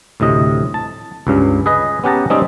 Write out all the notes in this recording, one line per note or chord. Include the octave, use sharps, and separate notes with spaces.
D2 A2 C3 D#5
A5
C#2 G2 C#3
G#4 B4 D#5
B3 C#4 G4 F#5 A5 A#5
G3 G#3 C4 C#4 D#4 G#4